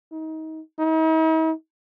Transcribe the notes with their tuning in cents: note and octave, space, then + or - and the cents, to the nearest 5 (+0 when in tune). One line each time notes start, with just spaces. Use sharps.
D#4 +30
D#4 +45